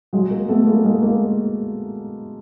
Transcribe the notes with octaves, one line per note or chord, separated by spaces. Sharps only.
F#3 G#3
G#3 A#3
A3 B3
G#3 A#3
G#3 A#3
G#3 A#3